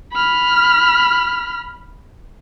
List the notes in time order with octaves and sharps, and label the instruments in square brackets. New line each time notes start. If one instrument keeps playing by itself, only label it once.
[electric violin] B5 F6